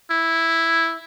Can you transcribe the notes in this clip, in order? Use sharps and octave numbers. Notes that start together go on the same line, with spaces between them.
E4